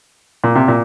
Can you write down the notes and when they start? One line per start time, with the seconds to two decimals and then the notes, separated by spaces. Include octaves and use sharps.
0.44 A#2
0.55 C3
0.68 A#2